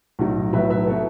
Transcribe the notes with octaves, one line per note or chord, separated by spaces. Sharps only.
B1 A2 F#3
B1 A2 F#3 B4 E5
B4 E5
B2 A4